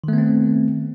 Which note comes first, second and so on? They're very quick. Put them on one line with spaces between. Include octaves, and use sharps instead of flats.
D#3 A3 B3 C4